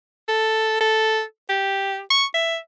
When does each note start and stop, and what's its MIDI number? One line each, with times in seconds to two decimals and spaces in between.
0.28 0.79 69
0.80 1.22 69
1.49 2.00 67
2.10 2.25 85
2.34 2.58 76